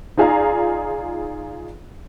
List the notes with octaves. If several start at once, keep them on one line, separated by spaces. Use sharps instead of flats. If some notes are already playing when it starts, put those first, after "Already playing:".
D#4 F4 G#4 D5 F5 A#5